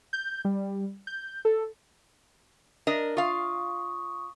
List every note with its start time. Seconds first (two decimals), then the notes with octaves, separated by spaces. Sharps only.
0.13 G6
0.45 G3
1.07 G6
1.45 A4
2.87 D4 A#4 D#5
3.17 F4 F5 C#6 D#6